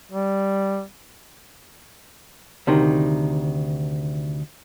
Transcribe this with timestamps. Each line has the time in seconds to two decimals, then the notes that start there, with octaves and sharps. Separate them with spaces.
0.11 G3
2.67 D2 C3 D#3